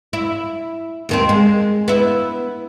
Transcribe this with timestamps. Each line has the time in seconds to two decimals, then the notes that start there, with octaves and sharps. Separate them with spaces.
0.13 E4
1.09 D#2 D#3 C4
1.29 G#3
1.88 B3 E4